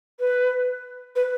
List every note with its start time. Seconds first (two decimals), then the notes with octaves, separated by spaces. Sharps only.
0.20 B4
1.15 B4